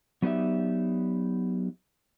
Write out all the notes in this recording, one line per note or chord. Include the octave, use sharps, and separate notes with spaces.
F#3 B3 D#4 G4 D5 E5